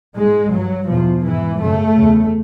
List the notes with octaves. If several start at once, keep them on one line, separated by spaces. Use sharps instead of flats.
G#2 G#3
G2 F#3
E2 B2 F3
G#2 E3
F#2 C#3 A3
C#3
E2